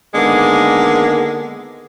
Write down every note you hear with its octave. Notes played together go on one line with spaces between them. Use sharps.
D3 D#3 G#3 A#3 B3